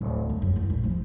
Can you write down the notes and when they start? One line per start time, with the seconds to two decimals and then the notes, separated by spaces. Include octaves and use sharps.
0.01 D1
0.29 F#2
0.42 F#2
0.56 E2
0.70 A#1
0.84 F3